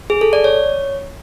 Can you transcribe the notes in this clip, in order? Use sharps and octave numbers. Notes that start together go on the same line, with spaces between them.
G#4
A4
D5
C#5